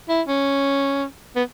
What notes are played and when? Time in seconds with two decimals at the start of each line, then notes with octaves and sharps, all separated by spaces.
0.09 E4
0.28 C#4
1.36 B3